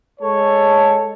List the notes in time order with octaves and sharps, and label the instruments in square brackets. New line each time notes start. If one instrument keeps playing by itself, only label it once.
[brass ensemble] G#3 A4 C#5